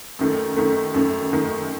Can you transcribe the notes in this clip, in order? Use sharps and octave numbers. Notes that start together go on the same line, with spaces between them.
F#2 D#3 A3
F#2 D#3 A3
F#2 D#3 A3
F#2 D#3 A3